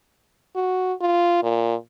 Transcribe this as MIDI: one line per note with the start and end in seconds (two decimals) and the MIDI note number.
0.55 0.93 66
1.01 1.40 65
1.43 1.75 46